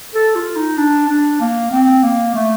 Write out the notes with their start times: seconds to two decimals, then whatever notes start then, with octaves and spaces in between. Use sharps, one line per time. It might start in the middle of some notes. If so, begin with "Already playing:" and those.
0.15 A4
0.35 F4
0.56 D#4
0.77 D4
1.08 D4
1.40 A#3
1.71 C4
2.03 A#3
2.34 A3